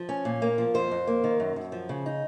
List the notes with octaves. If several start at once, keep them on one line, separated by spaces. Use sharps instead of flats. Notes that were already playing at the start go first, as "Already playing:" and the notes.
Already playing: F3
C#4
A#2
A#3
F3
F2 C5
F2
A#3
D#3
F#2
F#2
F3
C#3
D#4